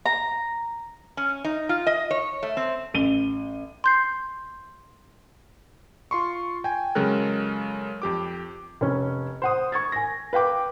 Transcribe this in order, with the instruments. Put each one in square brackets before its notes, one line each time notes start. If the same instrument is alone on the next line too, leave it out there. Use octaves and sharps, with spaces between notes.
[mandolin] A#5
[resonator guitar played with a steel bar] C#4
D#4
F4
D#5
C#5
A3
C4
[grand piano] A1 D#7 G7
[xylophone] C6 G6 C7
[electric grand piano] F4 C6 C#6
G5 G#5
C#3 F#3 G#3 A4 A#4 F#6
F2 G4 D6
[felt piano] F1 C#4
C5 F#5 D#6
C#6 G#6 A6
G#5 A#6
B4 F5 G5 D6